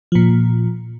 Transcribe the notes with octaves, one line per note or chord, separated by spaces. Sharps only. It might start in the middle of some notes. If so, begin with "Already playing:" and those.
A#2 F3